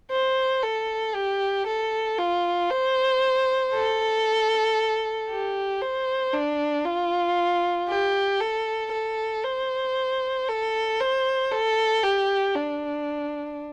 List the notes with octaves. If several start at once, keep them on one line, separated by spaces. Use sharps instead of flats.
C5
A4
G4
A4
F4
C5
A4
G4
C5
D4
F4
G4
A4
A4
C5
A4
C5
A4
G4
D4